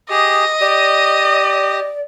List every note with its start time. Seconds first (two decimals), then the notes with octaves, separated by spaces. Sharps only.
0.10 G4 G#4 D#5
0.61 G4 D5